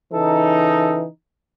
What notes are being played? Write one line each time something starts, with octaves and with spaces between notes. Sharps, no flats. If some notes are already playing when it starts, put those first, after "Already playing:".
C#3 E3 D#4 A4